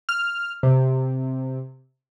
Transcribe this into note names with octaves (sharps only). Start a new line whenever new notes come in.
F6
C3